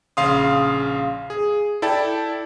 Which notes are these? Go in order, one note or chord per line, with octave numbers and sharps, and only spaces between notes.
A#1 C#3 F5 C6 D#6
G#4
E4 A4 D5 G5 A5